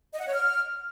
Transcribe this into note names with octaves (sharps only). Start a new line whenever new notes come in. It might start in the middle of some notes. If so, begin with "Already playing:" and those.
D#5
F#5
C#5
F6